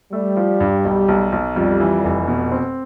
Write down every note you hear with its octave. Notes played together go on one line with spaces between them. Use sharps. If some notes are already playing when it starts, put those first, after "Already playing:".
G3 A3
F3
G2
B1
B1
B1
F2 G3
E3
F1
B2
C4